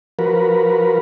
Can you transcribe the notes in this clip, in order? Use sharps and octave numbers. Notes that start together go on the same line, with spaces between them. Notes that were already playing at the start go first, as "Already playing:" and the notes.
F3 F#4 A#4 B4